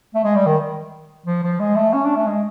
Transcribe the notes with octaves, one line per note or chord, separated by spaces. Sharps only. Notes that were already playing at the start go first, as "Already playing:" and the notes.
A3
G#3
G3
D#3
F3
F3
G#3
A3
C#4
D4
A3
G#3